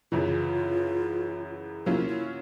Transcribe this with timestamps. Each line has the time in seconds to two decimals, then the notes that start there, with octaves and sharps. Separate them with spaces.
0.12 F#2 C#3 E3 F4
1.86 F#3 A#3 C#4 E4 F4
2.08 E4